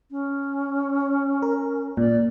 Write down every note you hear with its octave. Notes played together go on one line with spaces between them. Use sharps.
C#4
A#4
A#2 D5